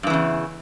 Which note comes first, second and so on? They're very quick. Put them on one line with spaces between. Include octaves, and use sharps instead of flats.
G2 E3 C#3 E2